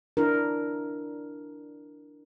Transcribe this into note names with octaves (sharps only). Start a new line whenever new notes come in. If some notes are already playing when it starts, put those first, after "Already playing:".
D4 E4 A#4